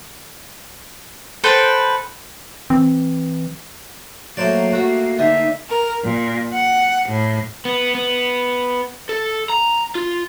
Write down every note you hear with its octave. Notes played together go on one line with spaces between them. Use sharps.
A4 B4 C5 G5
E3 C4
F#3 A3 A#3 C5 D5
F#4 E5
D3 D4 D#4 E5
A#4
A#2
F#5
A2
B3
B3
A4
A#5
F4